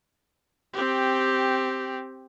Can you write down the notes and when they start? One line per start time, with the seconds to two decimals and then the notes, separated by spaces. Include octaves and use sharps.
0.74 C4 G4